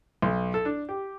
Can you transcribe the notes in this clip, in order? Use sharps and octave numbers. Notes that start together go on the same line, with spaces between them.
B1
A4
D4
G4